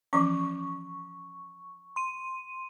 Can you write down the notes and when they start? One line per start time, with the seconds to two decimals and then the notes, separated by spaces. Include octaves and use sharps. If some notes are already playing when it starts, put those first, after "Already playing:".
0.13 E3 F3 C#4 C#6
1.96 C6 D#7